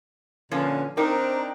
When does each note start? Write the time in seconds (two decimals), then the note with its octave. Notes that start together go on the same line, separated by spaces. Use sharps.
0.51 A#2 D3 F3 C#4 D4 B4
0.97 C4 D4 D#4 A#4 C5 G5 A#5